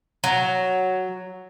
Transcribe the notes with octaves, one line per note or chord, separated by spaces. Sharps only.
F#3